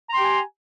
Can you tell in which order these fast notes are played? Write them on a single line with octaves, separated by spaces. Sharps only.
A#5 C6 G5 G4 G#5